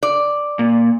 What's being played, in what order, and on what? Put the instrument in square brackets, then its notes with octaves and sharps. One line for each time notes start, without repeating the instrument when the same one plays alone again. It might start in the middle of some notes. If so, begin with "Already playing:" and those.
[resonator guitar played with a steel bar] D5
[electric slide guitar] A#2